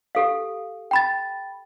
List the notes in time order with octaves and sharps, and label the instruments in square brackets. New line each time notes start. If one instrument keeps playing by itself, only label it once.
[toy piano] G4 A4 F5
[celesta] G5 B5 A6